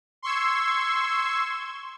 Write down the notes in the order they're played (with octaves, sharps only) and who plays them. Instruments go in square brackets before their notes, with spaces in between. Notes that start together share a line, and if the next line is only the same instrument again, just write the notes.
[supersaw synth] C6 C#6 E6 G#6